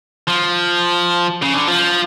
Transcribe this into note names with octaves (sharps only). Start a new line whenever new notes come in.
F3
C#3
D3
F3